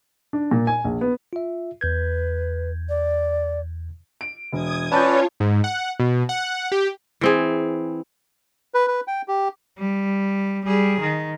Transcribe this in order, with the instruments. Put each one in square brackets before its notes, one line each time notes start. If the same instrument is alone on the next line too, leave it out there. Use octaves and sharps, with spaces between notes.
[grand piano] D4
A#2
G#5
A#1
B3
[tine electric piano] F4 E5
[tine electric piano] E2 G6 G#6 [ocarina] B4
[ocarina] D5
[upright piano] D7
[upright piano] E1 [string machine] D#6 G#6
[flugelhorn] C#4 [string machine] F4 C#5 [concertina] B4 D5 [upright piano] A5 G6
[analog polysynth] G#2
F#5
B2
F#5
G4
[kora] E3 C4 G#4
[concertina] B4
B4
G5
G4
[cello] G3
G3 G#4
D#3